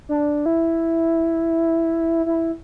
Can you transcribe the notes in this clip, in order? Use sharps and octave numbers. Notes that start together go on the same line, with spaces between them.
D4
E4
E4